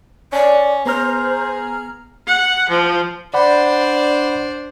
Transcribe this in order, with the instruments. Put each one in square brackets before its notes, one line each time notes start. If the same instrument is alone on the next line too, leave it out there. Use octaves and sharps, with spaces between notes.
[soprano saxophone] C#4 [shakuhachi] D5
[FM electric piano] B3 A#5 F6 [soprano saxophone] G#4 [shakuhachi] C5
[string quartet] F#5
F3
[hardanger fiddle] D4 C5 [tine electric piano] D5 F#5 B5